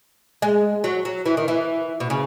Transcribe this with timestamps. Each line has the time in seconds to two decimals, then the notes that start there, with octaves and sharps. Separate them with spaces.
0.42 G#3
0.84 F#3
1.05 F#3
1.26 E3
1.37 D#3
1.48 E3
2.00 B2
2.10 C#3